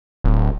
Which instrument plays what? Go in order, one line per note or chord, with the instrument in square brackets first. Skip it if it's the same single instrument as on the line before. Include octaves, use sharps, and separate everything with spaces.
[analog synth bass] D1